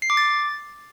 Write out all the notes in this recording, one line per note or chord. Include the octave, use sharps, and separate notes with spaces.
C7
D6
A6